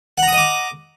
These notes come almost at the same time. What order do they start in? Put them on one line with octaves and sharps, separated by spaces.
F#5 A#5 D#6 D#5 D6